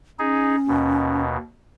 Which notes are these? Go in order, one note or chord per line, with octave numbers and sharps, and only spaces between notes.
C#4 D#4 G#4
D#2 B2